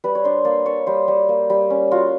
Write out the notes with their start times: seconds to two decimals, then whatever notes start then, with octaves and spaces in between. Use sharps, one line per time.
0.04 G3 B4
0.15 C#5
0.24 D4 C5
0.45 A#3 D5
0.66 A#3 C#5
0.87 G3 C5
1.08 G3
1.29 A#3
1.50 G3
1.70 C#4
1.91 F4 F#4